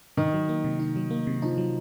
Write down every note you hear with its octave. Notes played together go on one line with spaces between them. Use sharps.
D#3 D#4
F#3
A#3
C3
D#4
F#3
A#3
C3
F3 D#4
F#3